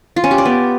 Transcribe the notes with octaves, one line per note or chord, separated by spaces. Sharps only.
F4
C#4
G4
D5
B3